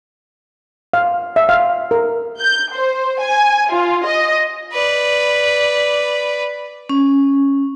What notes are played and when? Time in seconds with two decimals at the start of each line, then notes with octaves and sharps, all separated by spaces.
0.94 F5
1.36 E5
1.49 F5
1.91 A#4
2.40 G6
2.73 C5
3.19 G#5
3.72 F4
4.05 D#5
4.73 B4 D5
6.89 C#4